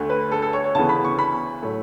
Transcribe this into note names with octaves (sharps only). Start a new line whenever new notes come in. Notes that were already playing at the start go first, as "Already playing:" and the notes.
Already playing: D2 D3 A3
B4
A4
A4
C#5
C#5
D2 C#3 E3 B3 A5
B5
C#6
B5
A2 F#3 A3